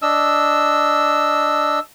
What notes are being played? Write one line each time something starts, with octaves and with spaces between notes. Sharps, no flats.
D4 D#5 E6